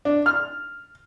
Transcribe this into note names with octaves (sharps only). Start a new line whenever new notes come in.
D4
F6